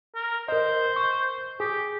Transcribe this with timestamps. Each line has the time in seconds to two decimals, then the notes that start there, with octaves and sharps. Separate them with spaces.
0.15 A#4
0.48 A#4 C5 D#5
0.96 C#6
1.60 G4 G#4